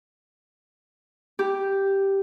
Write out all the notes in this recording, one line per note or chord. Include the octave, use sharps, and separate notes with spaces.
G4